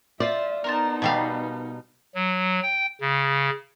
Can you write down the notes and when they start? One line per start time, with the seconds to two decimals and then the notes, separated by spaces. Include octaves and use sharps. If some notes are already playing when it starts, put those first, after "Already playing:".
0.20 F4 C5 D5 E5
0.64 B3 D#4 A#4 C5 A5
1.02 B2 G3 F5
2.14 F#3
2.63 G5
3.01 C#3